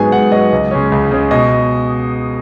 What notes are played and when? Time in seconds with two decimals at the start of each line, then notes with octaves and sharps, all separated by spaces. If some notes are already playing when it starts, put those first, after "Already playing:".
Already playing: G#2 F#3 B3 G#4 G#5
0.12 G#2 F#5
0.32 F#3 B3 D#5
0.52 C#2
0.71 C#3 G#3 C#4
0.92 C#2
1.11 C#3 G#3 C#4
1.31 B2 D#5